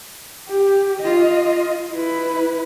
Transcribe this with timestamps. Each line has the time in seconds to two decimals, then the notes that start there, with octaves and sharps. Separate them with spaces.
0.48 G4
1.00 F4 D#5
1.91 E4 B4